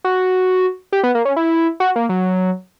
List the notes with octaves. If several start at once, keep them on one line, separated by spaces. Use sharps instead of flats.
F#4
G4
B3
A#3
C#4
E4
F#4
A#3
F#3